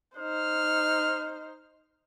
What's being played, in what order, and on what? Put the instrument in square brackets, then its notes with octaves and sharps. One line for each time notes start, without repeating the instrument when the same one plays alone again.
[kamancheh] D#4 C5 [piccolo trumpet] F6